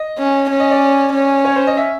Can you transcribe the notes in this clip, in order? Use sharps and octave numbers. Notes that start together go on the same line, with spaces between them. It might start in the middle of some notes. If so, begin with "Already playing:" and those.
Already playing: D#5
C#4
C#4
D#5
D5
C#4
C#5
C5
D#5
E5